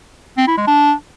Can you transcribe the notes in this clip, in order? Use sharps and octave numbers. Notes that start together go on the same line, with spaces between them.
C4
E4
G#3
D4